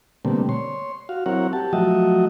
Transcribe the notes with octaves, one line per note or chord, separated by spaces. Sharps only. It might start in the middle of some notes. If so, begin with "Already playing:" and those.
B2 D3 G3 A3 A#3 C4
C#5 C6
F#4 F5
F#3 C4 E4 A#4 C#5 F#5
G4 A5
F3 F#3 A3 F#4 D#5 E5